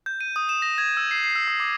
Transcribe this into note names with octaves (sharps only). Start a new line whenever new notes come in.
G6
D#7
D#6
E7
A#6
G#6
E6
C7
C7
E6
D#6
D6